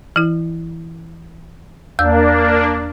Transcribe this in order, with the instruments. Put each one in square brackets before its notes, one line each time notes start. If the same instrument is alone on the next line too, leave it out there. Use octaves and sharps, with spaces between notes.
[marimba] E3 E4
[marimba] E2 E6 [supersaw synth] A#3 D4